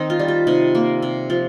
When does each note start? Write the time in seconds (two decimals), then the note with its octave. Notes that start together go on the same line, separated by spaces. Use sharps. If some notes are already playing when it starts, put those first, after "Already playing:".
Already playing: D#3 C4 D#4
0.10 F4
0.19 G3
0.28 G4
0.47 C3 D#4
0.75 A#3
1.02 C3
1.30 F3